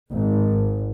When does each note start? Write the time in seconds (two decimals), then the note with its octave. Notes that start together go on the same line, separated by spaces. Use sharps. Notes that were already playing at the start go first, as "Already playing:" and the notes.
0.12 G#1